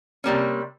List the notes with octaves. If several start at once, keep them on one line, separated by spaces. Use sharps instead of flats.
C3 G3 A#3 C#4